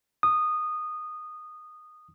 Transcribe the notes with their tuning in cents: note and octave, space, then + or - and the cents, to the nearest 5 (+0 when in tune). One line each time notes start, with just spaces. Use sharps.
D#6 -15